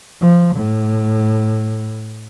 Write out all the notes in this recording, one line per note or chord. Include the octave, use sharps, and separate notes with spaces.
F3
A2